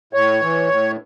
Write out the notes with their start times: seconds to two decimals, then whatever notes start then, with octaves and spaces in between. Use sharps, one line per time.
0.13 A2 C#5
0.42 E3
0.69 A2